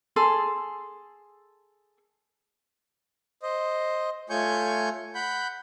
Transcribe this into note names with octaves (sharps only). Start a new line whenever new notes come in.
G#4 A4 C6
C5 D#5
A3 F4 C#5 G#5 C#6 G6
F#5 B5 G6